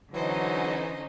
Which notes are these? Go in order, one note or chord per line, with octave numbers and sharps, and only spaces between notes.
D3 E3 F#3 C#4 D#4 C5 D#5